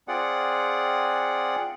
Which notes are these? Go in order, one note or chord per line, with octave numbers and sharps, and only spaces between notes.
C4 F4 G#4 D5 F#5